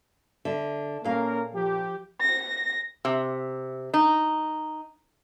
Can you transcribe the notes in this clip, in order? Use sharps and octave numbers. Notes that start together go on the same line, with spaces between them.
D3 E5
A#2 A#3 C#4 A#4 F5
F3 G4
A#6
C3
D#4